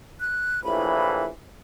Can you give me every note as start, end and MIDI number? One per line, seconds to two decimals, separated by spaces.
0.20 0.63 90
0.64 1.27 34
0.64 1.27 45
0.64 1.27 52
0.64 1.25 83